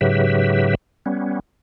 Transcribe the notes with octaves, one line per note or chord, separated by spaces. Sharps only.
G#2 C#3 F#3 G4 B4 E5
G3 B3 C#4